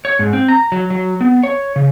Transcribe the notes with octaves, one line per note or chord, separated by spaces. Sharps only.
C#5
G#2
C4
A#5
F#3
F#3
B3
C#5
C#3